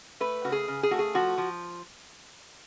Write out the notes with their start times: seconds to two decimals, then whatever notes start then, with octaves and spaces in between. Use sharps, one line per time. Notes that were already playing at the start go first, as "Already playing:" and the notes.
0.20 A3 B4
0.45 C#3 F#4
0.52 G#4
0.68 C#3
0.83 G#4
0.91 A3 F#4
0.99 G#4
1.15 F3 F#4
1.38 F3